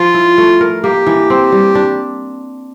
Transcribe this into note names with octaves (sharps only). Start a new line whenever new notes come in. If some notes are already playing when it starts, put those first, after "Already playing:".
Already playing: F3 F4
E4
A3
A#4
A#3 G4
E3
C4
G3
D4